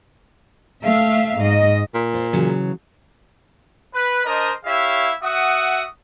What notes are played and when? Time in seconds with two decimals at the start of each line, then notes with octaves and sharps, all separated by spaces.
0.84 A3 E5 F5
1.40 G#2 D#5
1.94 A#2
2.13 F4 C5
2.33 C#3 E3 F#3
3.95 B4
4.26 D4 A#4 C5 D#5
4.65 E4 G4 C#5 E5 F5
5.22 F#4 E5 F#5 D#6